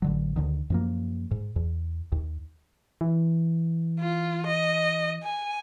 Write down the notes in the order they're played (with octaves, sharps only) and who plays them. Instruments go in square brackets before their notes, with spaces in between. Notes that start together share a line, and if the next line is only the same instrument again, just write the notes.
[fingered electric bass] A1 D3 F#3
D2 D3 D#3
F#2 F3 A#3
G#2
E2
D#2
[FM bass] E3
[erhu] F4
D#5
G#5